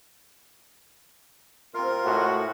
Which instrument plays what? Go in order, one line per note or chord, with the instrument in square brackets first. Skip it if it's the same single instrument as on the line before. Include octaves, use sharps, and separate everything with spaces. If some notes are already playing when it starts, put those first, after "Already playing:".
[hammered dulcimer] C3 F5 [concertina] F4 A#4
[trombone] A2 [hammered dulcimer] G#3 A3 [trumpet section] F#4